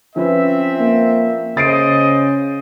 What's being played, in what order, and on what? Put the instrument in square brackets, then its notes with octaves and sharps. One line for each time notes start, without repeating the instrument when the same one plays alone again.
[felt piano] F3 C#4 B4 [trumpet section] C4 E5
[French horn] A#3
[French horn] C#3 [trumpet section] C5 D#5 [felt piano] A6 C7 D7